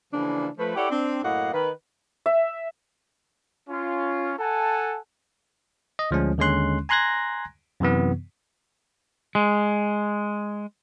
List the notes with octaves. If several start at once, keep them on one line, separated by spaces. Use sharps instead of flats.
C#3 E3 F3 A#3 D4
F3 A3 B4
E4 G4 A4 C#5 D5 F#5
C4 D4
F#2 A2 A#3 D#5 F5 F#5
D#3 B4
E5
C#4 F4
A4 F#5 G#5 A5
D#5
D2 F3 G#3 C#4
D#2 D3 G#3 C#4 C6 F#6
G#5 A#5 C6 F#6 G#6 A#6
F#2 C3 E3 B3
G#3